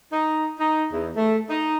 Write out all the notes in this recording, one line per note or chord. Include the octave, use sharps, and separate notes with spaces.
D#4
D#4
E2
A3
D#4